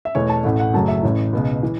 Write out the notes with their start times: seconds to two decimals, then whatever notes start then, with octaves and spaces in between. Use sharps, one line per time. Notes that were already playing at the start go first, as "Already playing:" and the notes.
0.05 E5
0.15 E2 B2 A3 C#5
0.29 A5
0.44 A1 A2 A3 F#5
0.59 F#5
0.74 F#1 F#2 F#3 A3 A5
0.88 E5
1.03 A1 A2 E3 C#5
1.33 C#2 B2 B3
1.63 E3